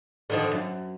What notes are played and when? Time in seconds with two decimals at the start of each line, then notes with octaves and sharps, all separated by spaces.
0.30 D3 D#3 F3
0.52 F#2